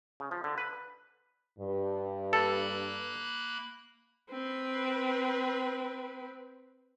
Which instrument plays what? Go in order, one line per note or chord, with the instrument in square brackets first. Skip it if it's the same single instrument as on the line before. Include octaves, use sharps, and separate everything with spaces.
[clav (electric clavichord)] C#3
F3
D3
B4
[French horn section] G2
[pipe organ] A#3 B5 F#6 [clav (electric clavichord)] A4
[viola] C4 B4